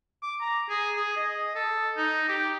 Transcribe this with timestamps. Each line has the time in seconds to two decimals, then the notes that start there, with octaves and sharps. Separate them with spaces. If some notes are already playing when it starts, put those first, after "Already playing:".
0.23 D6
0.41 A#5
0.69 G#4
0.97 G#4
1.17 D#5
1.55 A4
1.97 D#4
2.28 G4